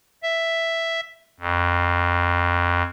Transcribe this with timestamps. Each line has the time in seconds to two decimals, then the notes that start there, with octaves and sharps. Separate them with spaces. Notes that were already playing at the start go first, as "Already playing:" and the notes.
0.23 E5
1.40 F2